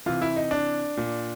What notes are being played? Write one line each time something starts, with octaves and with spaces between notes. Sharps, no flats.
C3 E3 F4
E4
D#4
D4
A#2